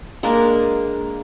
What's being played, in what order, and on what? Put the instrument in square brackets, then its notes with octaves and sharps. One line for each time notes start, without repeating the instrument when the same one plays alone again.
[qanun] G#3 A#3 D4 A#4